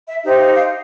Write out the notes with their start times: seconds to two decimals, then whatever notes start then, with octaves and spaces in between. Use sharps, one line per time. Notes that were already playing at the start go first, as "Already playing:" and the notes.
0.08 E5
0.24 D#4 G4 C5 E5
0.39 F5
0.54 F5